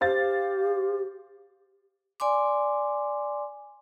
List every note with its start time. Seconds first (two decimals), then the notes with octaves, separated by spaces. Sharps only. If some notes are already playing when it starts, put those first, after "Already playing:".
0.01 G4 C5 F5 A6
2.20 D5 G#5 C6 D6